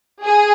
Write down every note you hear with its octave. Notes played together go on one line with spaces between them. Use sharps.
G#4